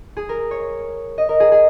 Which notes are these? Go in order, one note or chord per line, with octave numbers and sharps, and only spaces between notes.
G#4
A#4
C#5
D#5
A#4
G#4
G#4